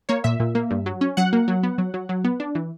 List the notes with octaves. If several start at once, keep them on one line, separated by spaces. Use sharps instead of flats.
A#3 C#5
A#2 E5
A#2
A#3
G2
F#3
C#4
F#3 F#5
A#3
F#3
B3
F#3
F#3
F#3
B3
D4
E3